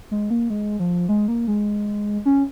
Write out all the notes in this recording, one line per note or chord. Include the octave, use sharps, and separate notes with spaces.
G#3
A#3
G#3
F3
G#3
A#3
G#3
C#4